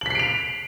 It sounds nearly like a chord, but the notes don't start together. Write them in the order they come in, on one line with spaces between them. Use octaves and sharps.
F#7 B6 C7 D7 F7